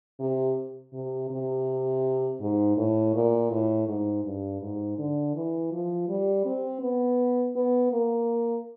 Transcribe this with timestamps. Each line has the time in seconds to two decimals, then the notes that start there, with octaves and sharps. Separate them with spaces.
0.20 C3
0.93 C3
1.30 C3
2.41 G#2
2.77 A2
3.14 A#2
3.51 A2
3.88 G#2
4.24 G2
4.61 G#2
4.98 D3
5.35 E3
5.72 F3
6.09 G3
6.45 C4
6.82 B3
7.56 B3
7.92 A#3